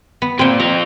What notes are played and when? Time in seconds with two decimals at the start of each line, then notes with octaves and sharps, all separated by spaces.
0.22 B3
0.39 A#2 C4 G5
0.60 C4 F4 A#5